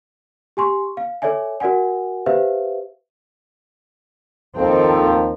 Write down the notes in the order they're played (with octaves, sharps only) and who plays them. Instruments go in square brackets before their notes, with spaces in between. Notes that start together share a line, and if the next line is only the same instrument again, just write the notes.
[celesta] G4 G#5 C6 C#6
F5
A4 C#5 D5 E5 G#5
F#4 A#4 D5 F#5 G#5
G4 B4 C5 E5 F5
[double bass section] D#2 C4 [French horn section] D#3 F3 [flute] A4